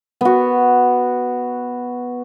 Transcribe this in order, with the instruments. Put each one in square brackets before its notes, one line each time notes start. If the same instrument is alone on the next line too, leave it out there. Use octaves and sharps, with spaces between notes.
[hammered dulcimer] B3 F#4